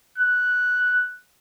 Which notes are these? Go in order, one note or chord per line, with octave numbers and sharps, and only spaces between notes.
F#6